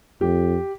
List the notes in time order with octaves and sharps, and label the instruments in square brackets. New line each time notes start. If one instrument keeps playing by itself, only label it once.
[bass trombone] F2 [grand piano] G4